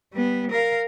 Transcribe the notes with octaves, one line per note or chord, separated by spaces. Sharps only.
G3 B3
A#4 F5